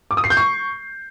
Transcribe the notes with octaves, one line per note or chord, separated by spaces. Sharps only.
D6
D#6
C7
G6
C#6